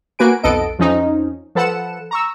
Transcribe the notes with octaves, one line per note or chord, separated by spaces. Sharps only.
A#3 F#4 B4 G#5 D7
B1 F2 B3 A4 D#5 D7
F2 F3 C#4 D#4
F3 A4 B4 F#5 C#7 E7
A#5 C#6 E6